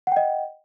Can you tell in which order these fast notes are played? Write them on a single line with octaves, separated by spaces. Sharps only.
F#5 G5 D#5